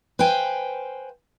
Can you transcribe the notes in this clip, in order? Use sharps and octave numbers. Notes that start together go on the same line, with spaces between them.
B4 C5 F5 G5 G#5